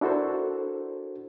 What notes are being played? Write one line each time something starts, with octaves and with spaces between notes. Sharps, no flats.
D4 E4 F#4 A4 A#4 C5